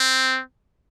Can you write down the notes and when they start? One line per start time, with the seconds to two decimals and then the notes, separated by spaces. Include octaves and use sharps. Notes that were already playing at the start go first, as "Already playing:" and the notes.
Already playing: C4